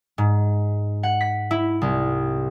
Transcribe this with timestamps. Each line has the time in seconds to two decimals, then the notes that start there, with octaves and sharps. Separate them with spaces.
0.18 G#2
1.03 F#5
1.21 B6
1.51 E4
1.82 C2